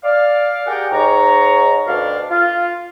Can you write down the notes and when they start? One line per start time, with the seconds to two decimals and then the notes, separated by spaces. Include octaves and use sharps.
0.04 D5 F5
0.67 G4 G#4 A#4 D5 F#5 G5
0.92 G#2 C#5 A#5
1.87 D2 B2 D4 F5
2.30 F4